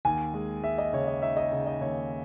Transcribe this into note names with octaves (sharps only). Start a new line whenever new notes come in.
D#2 G#5
G#3
G#3 E5
D#5
C#3 C#5
D#5
D#4 E5
D#5
C#3
D#5
D#2 C#5